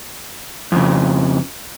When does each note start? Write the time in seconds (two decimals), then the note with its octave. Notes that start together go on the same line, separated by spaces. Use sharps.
0.72 F2 C#3